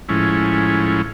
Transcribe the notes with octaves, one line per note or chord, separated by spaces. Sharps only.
A2 F3 G#3 C#4 E4